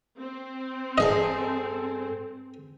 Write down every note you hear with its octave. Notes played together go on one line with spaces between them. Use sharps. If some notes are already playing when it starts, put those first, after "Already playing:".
C4
G2 G#4 A4 D#5